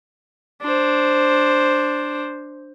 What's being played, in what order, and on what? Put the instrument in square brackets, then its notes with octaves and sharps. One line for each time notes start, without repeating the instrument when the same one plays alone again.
[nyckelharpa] D4 C5